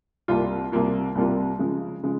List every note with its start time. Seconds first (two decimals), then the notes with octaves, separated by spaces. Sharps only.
0.28 C2 C3 G3 A#3 F4
0.72 C2 C3 G3 A#3 F4
1.15 C2 C3 G3 A#3 F4
1.59 C#3 F3 G#3
2.03 C#3 F3 G#3